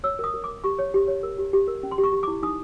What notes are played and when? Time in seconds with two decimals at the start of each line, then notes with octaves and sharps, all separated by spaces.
0.04 C#5 E6
0.19 A#4 D#6
0.34 A#4
0.44 A#4 D6
0.64 G4 C#6
0.79 C#5
0.94 G4
1.08 C#5
1.23 A#4
1.38 G4
1.53 G4
1.68 A#4
1.83 C#4
1.91 C6
1.98 G4
2.04 C#6
2.13 G4
2.23 E4 D6
2.43 D#4 D#6